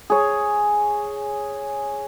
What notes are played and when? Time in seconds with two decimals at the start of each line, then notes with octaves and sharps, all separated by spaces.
0.10 G#4 C#5